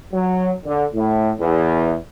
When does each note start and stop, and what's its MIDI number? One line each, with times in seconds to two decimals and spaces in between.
0.12 0.51 54
0.65 0.84 50
0.95 1.31 45
1.39 1.95 40